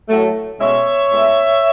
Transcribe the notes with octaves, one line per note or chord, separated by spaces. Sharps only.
A2 F#3 A3
B2 G#3 C#4 C#5 E5
A2 G#3 B3